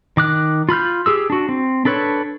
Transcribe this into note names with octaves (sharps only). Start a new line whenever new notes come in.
D#3 D6 F#6
F4 B5 F6 G6
G4 G#4 E6
D4 F#4
C4
D4 A4 B4 C#5